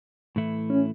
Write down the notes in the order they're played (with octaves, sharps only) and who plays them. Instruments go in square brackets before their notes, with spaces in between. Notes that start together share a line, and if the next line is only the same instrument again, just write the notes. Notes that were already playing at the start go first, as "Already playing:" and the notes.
[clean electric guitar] A2 E3 A3 E4
[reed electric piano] C#4